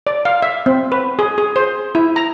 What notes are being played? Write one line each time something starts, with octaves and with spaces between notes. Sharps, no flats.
D5
F5
E5
C4
B4
G#4
G#4
C5
E4
A#5